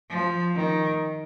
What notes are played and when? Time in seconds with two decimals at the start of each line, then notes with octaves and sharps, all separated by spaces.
0.10 F3
0.55 D#3